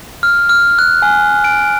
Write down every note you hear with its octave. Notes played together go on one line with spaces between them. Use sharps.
F6
F6
F#6
G#5
D7